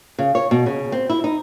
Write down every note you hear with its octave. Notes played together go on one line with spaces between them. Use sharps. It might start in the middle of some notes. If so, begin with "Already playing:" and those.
C#3
C#5
B2
C#3
C4
E4
D#4